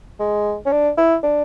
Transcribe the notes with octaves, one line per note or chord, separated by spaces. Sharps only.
G#3
C#4
D4
E4
D4